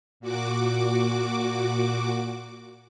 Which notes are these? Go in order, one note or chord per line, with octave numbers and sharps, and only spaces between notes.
A#2 F#4 D6